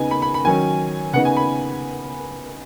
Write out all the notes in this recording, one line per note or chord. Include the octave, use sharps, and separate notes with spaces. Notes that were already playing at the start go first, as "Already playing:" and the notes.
Already playing: C#3 B3 D#4 G#5
B5
B5
B5
D#3 F#3 C#4 G#5
C#3 B3 D#4 F#5
G#5
B5